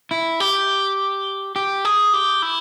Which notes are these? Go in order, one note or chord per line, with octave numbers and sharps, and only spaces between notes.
E4
G4
G4
G#4
G4
E4